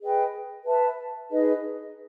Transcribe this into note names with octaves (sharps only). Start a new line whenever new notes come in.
G#4 B4 D#5 G5
B4 E5 A5
D#4 G#4 B4 D#5